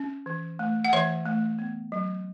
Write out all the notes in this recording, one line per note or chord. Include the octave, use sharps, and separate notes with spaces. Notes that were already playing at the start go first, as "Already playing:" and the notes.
Already playing: C#4
E3
A3
F#5
E3 C#5 E5
A3
B3
F#3